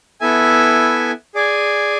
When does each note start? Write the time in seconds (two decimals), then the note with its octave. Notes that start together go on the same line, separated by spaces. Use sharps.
0.21 B3 E4 A4 E5 G#5
1.35 G#4 D5 G#5